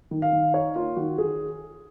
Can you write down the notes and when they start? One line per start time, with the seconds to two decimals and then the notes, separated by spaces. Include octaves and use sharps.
0.11 D#3
0.22 F5
0.33 D#3
0.54 D#4 C#5
0.75 A#3 F4
0.97 D#3 F#4
1.18 D#3 G#4